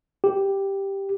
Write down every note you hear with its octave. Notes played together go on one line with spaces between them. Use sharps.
G4